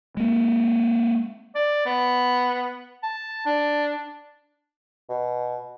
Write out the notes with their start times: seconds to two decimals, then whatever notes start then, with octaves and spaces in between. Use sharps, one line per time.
0.17 G#3 A#3
1.55 D5
1.86 B3
3.03 A5
3.46 D4
5.09 B2